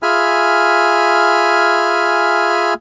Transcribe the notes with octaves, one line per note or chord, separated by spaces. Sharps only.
F4 G#4 E5 G#5 B5 F6